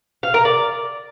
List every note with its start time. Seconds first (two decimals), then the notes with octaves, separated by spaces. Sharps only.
0.23 F5
0.34 A#4
0.45 D5